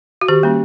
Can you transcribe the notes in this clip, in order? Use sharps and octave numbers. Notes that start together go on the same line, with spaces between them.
F#4
D#3 G4
G3 A#3 C#4